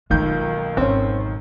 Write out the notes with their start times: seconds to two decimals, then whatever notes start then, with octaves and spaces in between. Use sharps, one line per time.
0.10 B1 D#3 G#3 A#3 F4 G6
0.77 G#1 C4 C#4